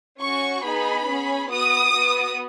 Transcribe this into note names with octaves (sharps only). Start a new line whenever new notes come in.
C#4 F#4 C#6
B3 D#4 G#4 B5
C#4 G#4
B3 F#4 D#6
B3 F#4